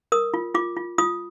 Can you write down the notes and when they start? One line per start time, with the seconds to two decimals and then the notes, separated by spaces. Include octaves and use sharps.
0.12 A#4 D#6
0.34 F4
0.55 F4 D6
0.77 F4
0.98 F4 D#6